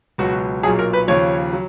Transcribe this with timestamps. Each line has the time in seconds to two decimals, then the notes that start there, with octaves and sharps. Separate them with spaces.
0.18 C#2 B2 F#3 F#4
0.63 B1 A#2 F#3 G#4
0.79 A#4
0.93 B4
1.08 D#2 C#3 F3 C#5
1.53 F#3